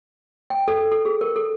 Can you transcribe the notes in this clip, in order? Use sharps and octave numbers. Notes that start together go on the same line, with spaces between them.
G5
A4
A4
G#4
A#4
A4